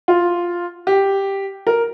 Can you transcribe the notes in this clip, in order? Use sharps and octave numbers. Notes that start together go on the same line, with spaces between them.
F4
G4
A#4